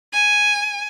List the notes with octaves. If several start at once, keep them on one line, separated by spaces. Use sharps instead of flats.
G#5